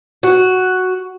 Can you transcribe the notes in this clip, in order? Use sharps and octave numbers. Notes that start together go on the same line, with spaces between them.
F#4